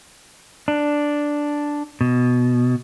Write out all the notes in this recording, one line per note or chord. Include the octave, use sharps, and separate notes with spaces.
D4
B2